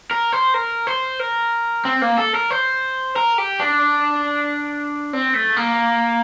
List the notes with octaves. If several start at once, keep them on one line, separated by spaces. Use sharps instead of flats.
A#4
C5
A#4
C5
A#4
C4
A#3
A4
A#4
C5
A#4
G4
D4
C4
A3
A#3